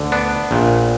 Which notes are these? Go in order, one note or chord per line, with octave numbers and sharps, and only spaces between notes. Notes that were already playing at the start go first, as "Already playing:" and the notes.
Already playing: D2 D3
B3 D4
A#1 A#2